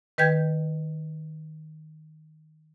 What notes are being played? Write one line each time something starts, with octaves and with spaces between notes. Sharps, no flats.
D#3 B4 G5 G6 G#6